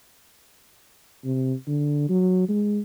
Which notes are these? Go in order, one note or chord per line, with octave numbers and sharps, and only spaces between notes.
C3
D3
F#3
G#3